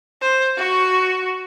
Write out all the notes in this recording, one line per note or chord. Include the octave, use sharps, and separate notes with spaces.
C5
F#4 C#6